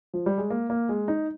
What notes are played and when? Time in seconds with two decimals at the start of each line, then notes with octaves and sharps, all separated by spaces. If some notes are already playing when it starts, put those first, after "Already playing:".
0.14 F3
0.26 G3
0.38 G#3
0.50 A#3
0.70 A#3
0.89 G#3
1.08 D#4